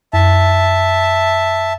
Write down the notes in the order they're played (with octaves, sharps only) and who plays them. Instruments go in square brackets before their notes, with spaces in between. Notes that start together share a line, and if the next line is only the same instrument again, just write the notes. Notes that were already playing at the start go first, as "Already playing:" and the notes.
[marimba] F#2 [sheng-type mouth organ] E5 A5